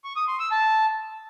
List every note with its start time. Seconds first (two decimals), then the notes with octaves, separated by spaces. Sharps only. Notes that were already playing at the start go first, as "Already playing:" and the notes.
0.04 C#6
0.16 D#6
0.28 C6
0.39 E6
0.51 A5